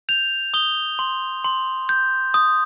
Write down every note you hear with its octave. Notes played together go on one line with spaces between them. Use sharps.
G6 F7
D#6 G7
C6
C6
G6
D#6